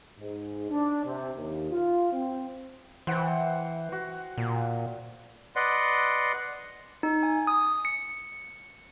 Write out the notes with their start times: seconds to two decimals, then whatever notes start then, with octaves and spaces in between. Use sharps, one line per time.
0.20 G#2
0.71 D4
1.05 C3
1.37 D#2
1.71 F4
2.13 C4
3.07 E3 C5 F#5 G5
3.92 F#4
4.38 A#2
5.56 B4 D5 D#5 F#5 C6
7.03 D#4
7.23 G#5
7.47 D#6
7.85 C#7